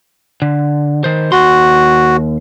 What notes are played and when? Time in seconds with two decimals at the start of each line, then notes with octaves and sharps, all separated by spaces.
0.42 D3
1.04 D#3 C5
1.32 D#2 F#4 C6